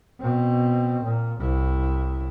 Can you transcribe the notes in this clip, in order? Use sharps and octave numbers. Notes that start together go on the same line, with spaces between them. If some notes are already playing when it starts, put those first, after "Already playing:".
B2 C4
A#2
C2 E4